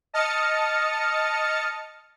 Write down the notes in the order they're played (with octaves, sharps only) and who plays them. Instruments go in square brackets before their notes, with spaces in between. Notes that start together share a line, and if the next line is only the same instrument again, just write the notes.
[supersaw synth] D#5 A5 D#6 F6 A6 C#7